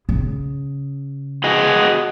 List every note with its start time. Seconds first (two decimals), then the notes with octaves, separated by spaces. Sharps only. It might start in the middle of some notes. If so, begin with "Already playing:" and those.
0.09 C#3
1.44 F#4 G#4 D#5